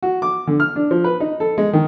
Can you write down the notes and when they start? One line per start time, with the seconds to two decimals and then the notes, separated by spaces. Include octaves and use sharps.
0.03 F#4
0.22 D6
0.47 D3
0.60 F6
0.76 D4
0.91 F3
1.04 B4
1.20 D#4
1.40 A4
1.58 G#3
1.73 D#3